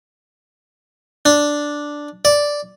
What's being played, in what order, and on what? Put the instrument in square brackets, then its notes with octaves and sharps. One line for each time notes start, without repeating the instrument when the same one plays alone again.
[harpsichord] D4
D5